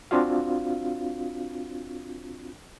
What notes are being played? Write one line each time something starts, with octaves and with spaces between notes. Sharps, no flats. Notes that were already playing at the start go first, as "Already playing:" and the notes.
C4 D4 F4 F#4 F5